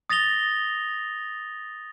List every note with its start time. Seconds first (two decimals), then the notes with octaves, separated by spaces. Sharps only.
0.10 D#6 A6 A#6 F7 G7